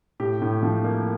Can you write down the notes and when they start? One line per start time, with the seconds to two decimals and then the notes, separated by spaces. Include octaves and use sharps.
0.20 A2 G4
0.42 A2
0.63 F3
0.84 A#3